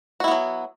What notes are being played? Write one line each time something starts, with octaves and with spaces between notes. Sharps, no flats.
F#3 B3 E4 F#4